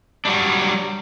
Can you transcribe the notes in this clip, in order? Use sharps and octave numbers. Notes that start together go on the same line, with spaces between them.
F#3 G3 D4